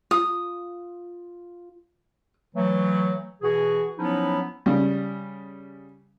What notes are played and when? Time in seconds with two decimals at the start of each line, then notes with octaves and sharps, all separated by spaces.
0.11 F4 D#6
2.55 E3 F#3 A3
3.42 B2 E3 F#4 G#4
3.98 F3 F#3 B3 C#4 D#4 E4
4.66 C#3 G3